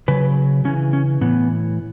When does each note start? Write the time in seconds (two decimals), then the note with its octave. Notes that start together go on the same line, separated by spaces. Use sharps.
0.08 C#3 F#3 B4
0.65 C#3 E3 C#4
0.93 C#4
1.21 A2 E3 B3